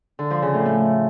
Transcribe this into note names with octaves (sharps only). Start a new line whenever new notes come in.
D3
F3
C#3
A2
A3